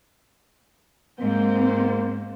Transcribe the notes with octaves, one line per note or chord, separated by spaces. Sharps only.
G#2 A#3 C4 C5